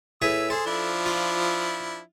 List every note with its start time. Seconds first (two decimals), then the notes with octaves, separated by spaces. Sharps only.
0.22 A2 G#4 B4 E6
0.50 G#4 A4 C5
0.66 F3 D4 E4
1.06 F4